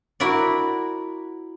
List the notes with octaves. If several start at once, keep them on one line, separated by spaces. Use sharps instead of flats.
E4 F#4 A#4 D5